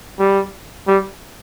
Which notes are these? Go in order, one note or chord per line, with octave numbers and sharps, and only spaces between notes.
G3
G3